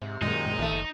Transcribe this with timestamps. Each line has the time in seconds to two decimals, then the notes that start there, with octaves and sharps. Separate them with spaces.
0.02 G#2 C3
0.21 F#2 A#2 D#3 G#3 D#4
0.59 A#1 D#2 A3
0.71 F#1